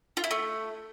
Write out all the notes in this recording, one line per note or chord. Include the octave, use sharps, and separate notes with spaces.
F4
E4
A3